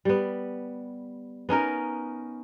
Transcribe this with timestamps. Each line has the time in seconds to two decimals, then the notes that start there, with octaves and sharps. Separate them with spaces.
0.05 G3 B3
1.49 B3 C#4 D#4 A#4